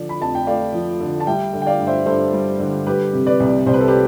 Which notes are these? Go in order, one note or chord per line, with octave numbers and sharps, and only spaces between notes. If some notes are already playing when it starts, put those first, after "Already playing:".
Already playing: D3 F3 D5
B5
F2 A5
G5
A3 D5 F5
F3
D3
A5
G3 E5 G5
D3
G5
D5 F5
G2
C5 E5
G2 A4 C5
G3
D3
G3 G4 B4
C3
B4 D5
C2
C2 C5
B4
A4
G4 B4